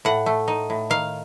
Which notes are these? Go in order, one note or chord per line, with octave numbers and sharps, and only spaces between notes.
A2 F#5
A3
D#4
A2
D#3 F5